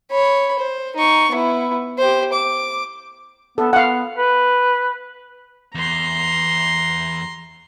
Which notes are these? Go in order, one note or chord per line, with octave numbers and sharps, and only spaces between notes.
C#5 B5
C5
D#4 C#6
B3 E4
G4 C5
D6
B3 A4
B3 F5 F#5
B4
E2 A#5 C6